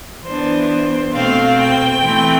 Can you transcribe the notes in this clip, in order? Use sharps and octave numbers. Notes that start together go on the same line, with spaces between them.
E3 B3 D4 C5
C5
B2 A3 C4 F5
G5
E3 A3 C4